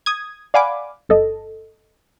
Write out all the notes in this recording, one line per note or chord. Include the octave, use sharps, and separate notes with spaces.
D#6 G#6
D5 F5 F#5 G#5 B5 D6
G1 A4 D#5